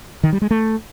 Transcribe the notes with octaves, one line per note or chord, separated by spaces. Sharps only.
D#3
G3
G#3
A3